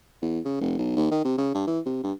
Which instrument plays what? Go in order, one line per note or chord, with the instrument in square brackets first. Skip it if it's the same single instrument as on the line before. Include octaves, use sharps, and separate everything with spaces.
[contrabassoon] E2
C#3
F1
B1
D#2
D#3
C3
C#3
G2
E3
C3
G2